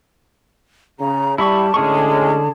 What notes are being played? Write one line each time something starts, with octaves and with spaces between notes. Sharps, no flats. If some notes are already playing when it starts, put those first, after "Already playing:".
C#3 A#5
G3 E4 A5 B5 C#6
A2 D3 G#3 C#4 G#4 C#6